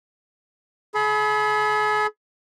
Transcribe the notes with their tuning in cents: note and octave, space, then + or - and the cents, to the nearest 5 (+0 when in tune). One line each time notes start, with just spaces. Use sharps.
G#4 +40 B5 +0